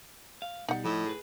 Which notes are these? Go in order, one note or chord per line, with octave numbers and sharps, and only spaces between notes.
F5
B2 G3 D#4 F#5
A2 F3 A3 D#5
G#4 B4